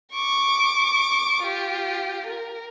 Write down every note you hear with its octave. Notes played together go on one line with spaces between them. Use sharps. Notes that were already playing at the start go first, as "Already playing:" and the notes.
C#6 D6
F4 G4
A#4